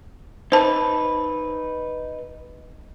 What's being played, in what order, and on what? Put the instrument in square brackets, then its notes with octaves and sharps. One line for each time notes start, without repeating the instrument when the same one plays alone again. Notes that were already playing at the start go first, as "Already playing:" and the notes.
[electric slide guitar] D#4 B4 [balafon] C5 A5